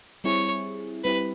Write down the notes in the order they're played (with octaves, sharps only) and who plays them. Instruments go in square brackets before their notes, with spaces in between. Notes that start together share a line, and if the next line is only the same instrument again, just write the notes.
[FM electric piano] G3 C4 E4 G#4 [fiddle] C#5
[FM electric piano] G3 C4 E4 G4 [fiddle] B4